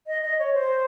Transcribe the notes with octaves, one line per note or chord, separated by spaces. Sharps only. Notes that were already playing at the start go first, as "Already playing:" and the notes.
D#5
D#5
C#5
C5